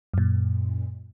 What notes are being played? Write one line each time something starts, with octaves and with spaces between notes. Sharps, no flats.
F#2 A#2